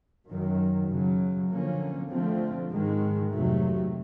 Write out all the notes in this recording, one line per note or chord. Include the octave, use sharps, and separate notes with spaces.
F#2 D#3 F#3
F#2 C#3 F#3
D3 F3 A#3 C#4
D3 F3 A3 C4
G#2 D#3 G#3
F2 C3 D#3 F#3 A3